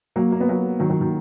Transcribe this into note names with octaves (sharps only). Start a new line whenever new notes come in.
F#3 A#3
A#3
B3
F#3 A#3
D#3 F#3
D#3 F#3
D#3